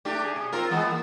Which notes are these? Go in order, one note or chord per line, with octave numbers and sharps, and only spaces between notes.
A3 D4 G4
G#4
B2
C4 F4 A#4
E3 G#3 B3
A#3